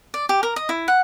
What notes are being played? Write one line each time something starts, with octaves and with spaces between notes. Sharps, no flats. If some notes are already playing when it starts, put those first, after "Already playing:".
D5
G4
A#4
D#5
E4
F#5